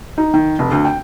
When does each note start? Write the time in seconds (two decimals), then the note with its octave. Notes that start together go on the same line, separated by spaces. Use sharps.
0.18 D#4
0.34 D#3
0.59 F1
0.71 D2
0.85 G5